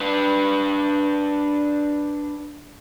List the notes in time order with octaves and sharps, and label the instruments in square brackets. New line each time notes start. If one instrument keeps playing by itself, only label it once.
[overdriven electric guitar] D4 B4